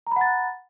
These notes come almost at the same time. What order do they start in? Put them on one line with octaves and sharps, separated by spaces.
A#5 B5 F#5 A6 F#6